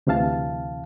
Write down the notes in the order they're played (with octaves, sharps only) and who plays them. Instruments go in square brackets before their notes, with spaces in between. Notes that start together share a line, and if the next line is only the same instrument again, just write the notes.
[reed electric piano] D2 C3 E3 F5 A5